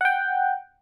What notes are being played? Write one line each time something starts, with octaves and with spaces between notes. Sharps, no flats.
F#5 G5